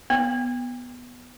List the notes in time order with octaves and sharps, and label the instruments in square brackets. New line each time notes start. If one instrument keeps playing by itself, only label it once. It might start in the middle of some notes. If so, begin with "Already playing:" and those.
[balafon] B3